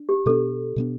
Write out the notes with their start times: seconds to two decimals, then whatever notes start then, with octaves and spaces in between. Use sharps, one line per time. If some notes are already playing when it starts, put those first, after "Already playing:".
Already playing: D4
0.09 G4
0.26 B2 G3 B3 D4 A4
0.76 B2 G3 B3 D4